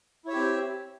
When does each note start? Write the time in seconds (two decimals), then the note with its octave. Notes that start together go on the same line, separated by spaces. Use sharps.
0.25 E4
0.28 C#5
0.30 E5
0.33 G4
0.36 C4